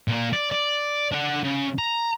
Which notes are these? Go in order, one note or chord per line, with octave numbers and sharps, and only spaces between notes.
A#2 A#3
D5
D5
D4 F#5
C#3
A#5